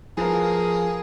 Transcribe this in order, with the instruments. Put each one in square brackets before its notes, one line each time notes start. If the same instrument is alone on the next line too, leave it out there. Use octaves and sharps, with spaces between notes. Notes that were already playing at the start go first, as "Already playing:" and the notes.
[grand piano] F3 B4 [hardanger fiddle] A#3 [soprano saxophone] G#4